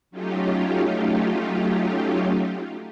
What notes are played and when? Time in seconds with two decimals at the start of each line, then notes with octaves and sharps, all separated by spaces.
0.11 F#3 A3 C#4 D#4 F4 G4